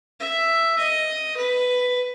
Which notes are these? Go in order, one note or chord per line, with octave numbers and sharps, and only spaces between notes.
E5
D#5
B4